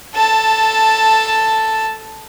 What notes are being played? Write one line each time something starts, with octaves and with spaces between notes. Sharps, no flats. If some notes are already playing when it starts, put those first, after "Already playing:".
A4 A5